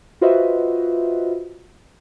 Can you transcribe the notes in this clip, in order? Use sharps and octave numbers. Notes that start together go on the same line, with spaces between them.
F4 F#4 B4 C5 D#5 E5